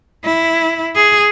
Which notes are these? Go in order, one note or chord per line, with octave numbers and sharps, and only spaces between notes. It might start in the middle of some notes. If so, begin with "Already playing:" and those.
E4
G#4